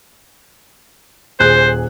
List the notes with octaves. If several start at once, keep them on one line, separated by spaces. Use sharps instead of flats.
D#1 G#4 C5 F#6